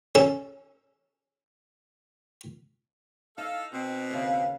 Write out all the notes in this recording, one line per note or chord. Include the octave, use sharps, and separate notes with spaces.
C#4 A4
D#4 A4 F5
B2 C4
D#2 C#3 F5